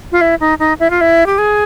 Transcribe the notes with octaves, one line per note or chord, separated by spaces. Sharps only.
F4
E4
D#4
D#4
E4
F4
E4
G4
G#4